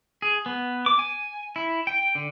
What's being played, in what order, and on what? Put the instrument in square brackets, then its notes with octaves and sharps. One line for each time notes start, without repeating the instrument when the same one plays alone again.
[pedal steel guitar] G#4
B3
D6
G#5
E4
G5
D3